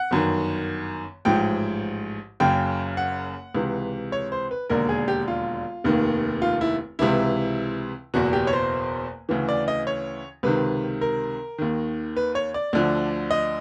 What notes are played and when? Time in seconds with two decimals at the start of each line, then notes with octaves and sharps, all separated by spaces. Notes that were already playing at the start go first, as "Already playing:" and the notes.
Already playing: F#5
0.11 G1 F#2 D#3
1.25 A1 G#2 F3 G5
2.40 F#1 F#2 C#3 G5
2.97 F#5
3.55 C#2 C3 E3
4.12 C#5
4.32 C5
4.51 B4
4.70 E1 D#2 D3 A#4
4.89 G#4
5.08 G4
5.28 F4
5.84 F1 D#2 D#3
6.42 F4
6.61 E4
6.99 C#2 C3 E3 E4
8.14 F#1 E2 B2 F#4
8.33 G4
8.47 C#5
8.53 C5
9.29 D2 C#3 E3
9.49 D5
9.68 D#5
9.87 C#5
10.43 C#2 C3 D#3 B4
11.01 A#4
11.58 D#2 D#3
12.17 B4
12.35 C#5
12.54 D5
12.73 D2 D3 F3
13.31 D#5